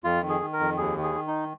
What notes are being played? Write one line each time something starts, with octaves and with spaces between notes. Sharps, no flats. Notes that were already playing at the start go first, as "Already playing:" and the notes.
F2 F4
D#3
G#4
D#3
A#4
F2
D#2 G#4
D#3
G#4
D#3
D#4